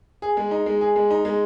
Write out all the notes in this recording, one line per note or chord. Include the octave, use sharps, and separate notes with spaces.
G#4
G#3
D#4
G#3
G#4
G#3
D#4
G#3